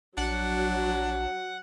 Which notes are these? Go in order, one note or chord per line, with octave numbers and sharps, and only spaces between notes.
A#1 F#3 D4 F#5